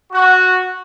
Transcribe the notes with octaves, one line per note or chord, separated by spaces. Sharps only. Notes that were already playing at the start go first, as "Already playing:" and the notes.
F#4